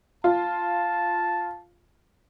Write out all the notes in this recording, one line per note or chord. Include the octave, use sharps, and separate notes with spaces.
F4 A5